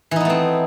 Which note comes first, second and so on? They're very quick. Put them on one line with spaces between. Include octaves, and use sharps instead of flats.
E3 D#4 B3 A3 C4